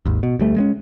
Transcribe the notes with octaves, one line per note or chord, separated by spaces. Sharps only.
G#1 D#2
B2
D2 G3 A3
G#3 A3 C#4